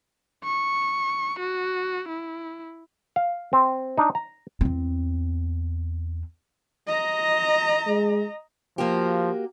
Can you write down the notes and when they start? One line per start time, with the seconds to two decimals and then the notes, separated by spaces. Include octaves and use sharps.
0.44 C#6
1.39 F#4
2.08 E4
3.16 F5
3.53 C4
3.98 D4 D#4
4.15 A#5
4.61 E2 C4
6.87 D#5 A#5
7.87 G#3
8.78 F3 A#3 F#4 G4